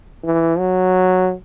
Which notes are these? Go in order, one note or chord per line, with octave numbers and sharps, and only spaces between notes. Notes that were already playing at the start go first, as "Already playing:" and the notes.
E3
F#3